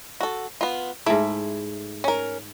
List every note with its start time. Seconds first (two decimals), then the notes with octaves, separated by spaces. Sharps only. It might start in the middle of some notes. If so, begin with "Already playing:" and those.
0.21 F#4 A4
0.61 B3 F4
1.06 G#2 A3 E4 E5
2.04 C#4 A#4